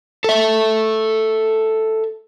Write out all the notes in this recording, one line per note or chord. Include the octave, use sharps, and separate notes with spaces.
A4 E5